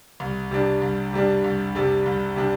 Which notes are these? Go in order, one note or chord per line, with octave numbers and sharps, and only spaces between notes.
C2
C3 G3 D4
C2
C3 G3 D4
C2
C3 G3 D4
C2
C3 G3 D4